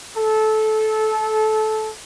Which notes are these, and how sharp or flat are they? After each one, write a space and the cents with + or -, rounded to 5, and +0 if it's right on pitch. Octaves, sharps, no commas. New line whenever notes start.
A4 -20